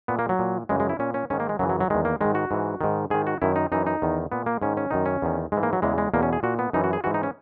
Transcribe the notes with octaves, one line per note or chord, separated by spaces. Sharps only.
A#2 B3
A#3
F#3
A#2
F#2 C#3 E3 G#3
G#3
E4
A#2 C#4
C#4
G#2 D#3 C#4
A#3
G#3
F#2 C#3 E3 F#3
F#3
F#3
E2 D#3 G#3
A#3
G#2 D#3 G#3
F#4
G#2 E3
G#2 D#3
G#2 D#3 G#4
F#4
F#2 D#3 E4
D#4
F#2 E3 D#4
D#4
E2 D#3
A#2 B3
A#3
G#2 D#3 C#4
C#4
F#2 D#3 D#4
C#4
E2 D#3
G#2 E3 G#3
A#3
F#3
E2 C#3 E3 G#3
G#3
E2 B2 A#3
C#4
G#4
A#2 F#4
B3
F#2 E3 D#4
F#4
G#4
G#2 E3 F#4
D#4
C#4